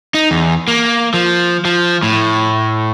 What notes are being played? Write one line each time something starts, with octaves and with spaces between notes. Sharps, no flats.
D#4
E2
A#3
F3
F3
A2